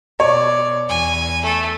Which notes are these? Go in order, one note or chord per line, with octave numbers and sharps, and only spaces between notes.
B2 C#5 D5
E2 G#5
A3 A4